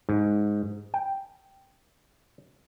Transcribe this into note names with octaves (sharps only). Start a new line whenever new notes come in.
G#2
G5